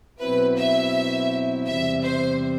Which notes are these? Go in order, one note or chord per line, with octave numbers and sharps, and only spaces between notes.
B2 F#3 C4 E4 B4
E5
E2 C3 G3 C4 E5
C5